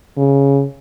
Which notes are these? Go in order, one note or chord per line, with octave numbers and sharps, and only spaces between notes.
C#3